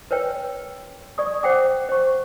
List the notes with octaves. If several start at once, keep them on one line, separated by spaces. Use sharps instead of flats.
A#4 B4 C#5 G5
D5 C#6 D#6
C5 F#5 G5 D6
C5 C#6